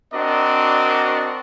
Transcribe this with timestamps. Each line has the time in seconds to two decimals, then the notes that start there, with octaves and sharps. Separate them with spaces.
0.13 C4 D4 F#4 A#4 D5 D#5